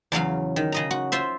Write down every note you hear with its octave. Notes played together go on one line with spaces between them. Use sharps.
E2 C#3 F#3 F5
D#3
C#3 D#5 A#5
F#4
F4 C5 E5